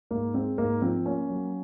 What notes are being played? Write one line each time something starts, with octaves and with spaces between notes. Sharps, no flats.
G#2 A#3
G#3 C4
G#2 A#3
F3 C4
A#3 C#4
F#3